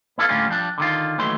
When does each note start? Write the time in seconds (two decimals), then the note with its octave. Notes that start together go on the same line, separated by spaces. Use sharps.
0.18 B3 E4 A4 D5 F5
0.29 A2 D3 G3 A#3 C#4 F4
0.48 F3 G3 D4
0.78 D3 D#3 F4
1.18 D#2 E3 F#3 A3 C6